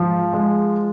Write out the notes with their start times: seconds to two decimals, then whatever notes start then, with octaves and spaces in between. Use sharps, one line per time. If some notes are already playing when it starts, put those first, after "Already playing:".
Already playing: G#2 F3
0.33 G#3